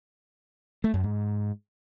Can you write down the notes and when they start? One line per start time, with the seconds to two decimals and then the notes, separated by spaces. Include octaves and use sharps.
0.84 A3
0.94 F#2
1.04 G#2